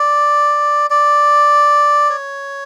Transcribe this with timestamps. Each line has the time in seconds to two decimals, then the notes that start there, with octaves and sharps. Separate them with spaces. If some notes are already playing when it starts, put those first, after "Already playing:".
Already playing: D5
0.90 D5
2.10 C#5